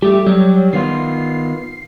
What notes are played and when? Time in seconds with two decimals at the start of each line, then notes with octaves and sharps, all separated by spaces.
0.02 G3 A3 G4
0.26 F#3 G3
0.73 D#3 B3 F4 C7